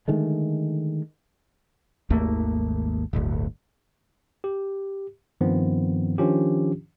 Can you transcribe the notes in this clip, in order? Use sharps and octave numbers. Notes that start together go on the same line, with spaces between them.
D3 D#3 G#3 A3
G#1 D#2 A3 A#3
D1 G1 D2
G4
G2 D#3 F3 B3 C4
D#3 F3 C#4 D4 F4 G4